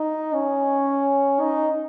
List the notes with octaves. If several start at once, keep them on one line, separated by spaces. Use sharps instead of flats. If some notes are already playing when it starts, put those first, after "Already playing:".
Already playing: D#4
C#4
D#4